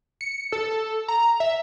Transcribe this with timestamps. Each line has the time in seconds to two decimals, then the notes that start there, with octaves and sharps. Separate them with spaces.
0.21 C#7
0.52 A4
1.08 A#5
1.40 E5